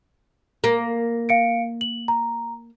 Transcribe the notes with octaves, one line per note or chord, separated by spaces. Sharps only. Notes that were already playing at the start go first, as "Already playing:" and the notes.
A#3
F5 C#7 D7
F#7
A#5